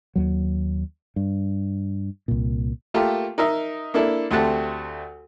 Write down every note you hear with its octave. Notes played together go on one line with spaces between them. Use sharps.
D#2 F#3
G2
C2 A#2
A3 A#3 F4 G4 A4 A#4
D#4 A#4 D#5 E5
A#3 D4 E4 A4
D2 A3 C4 G4 F#5 A5